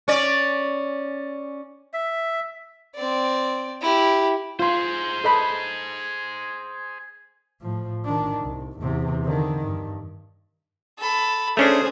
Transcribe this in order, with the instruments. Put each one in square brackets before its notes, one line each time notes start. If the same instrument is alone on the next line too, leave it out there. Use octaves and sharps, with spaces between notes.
[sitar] C#4 D5
[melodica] E5
[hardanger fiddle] C4 D5
E4 G4
[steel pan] F4 C6 [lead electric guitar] G#4 C5
[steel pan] A4 D#5 B5
[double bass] A2 F3
D#3 D4
C2
E2 C3
D3 D#3
G2
[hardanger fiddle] A4 B5
[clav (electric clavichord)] A3 C#4 D4 [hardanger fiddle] G#4 C5